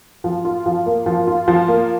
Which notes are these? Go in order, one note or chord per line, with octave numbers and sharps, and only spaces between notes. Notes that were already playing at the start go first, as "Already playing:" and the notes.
F3
F4
F3
A#3
F3
F4
F3
A#3